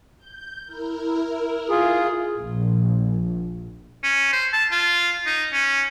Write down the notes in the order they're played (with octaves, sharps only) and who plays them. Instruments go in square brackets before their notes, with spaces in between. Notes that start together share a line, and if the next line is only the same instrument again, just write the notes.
[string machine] G6
E4 A#4
[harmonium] F4 G#4
[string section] A#1
[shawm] C#4
C5
A5
F4
D#4
C#4